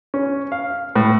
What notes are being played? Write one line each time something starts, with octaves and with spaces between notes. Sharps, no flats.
C#4
F5
A2